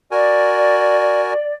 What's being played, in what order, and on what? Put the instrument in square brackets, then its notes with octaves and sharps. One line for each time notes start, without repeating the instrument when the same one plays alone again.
[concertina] F#4 A#4 G#5 [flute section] D5